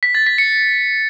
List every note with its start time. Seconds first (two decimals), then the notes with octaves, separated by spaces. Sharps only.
0.03 B6
0.15 A6
0.26 B6
0.38 C#7